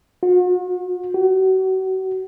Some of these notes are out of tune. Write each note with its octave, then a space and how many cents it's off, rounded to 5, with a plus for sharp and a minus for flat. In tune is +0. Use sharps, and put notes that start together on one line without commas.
F#4 -45
F#4 +35